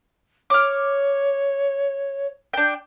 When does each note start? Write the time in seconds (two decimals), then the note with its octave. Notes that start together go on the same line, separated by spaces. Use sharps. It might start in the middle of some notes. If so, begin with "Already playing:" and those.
0.50 C#5 D6 F6
2.53 D4 G5